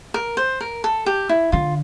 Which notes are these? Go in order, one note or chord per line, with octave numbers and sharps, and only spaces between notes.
A#4
C5
A#4
A4
G4
E4
D3 F4